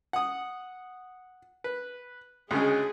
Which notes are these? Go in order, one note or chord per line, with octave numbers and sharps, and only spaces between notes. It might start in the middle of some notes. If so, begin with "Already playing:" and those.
F#5 D#6
B4
D2 C#3 G#3 G#4